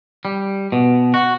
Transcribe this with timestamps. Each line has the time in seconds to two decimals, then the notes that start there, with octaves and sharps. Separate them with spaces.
0.25 G3
0.72 B2
1.14 F#4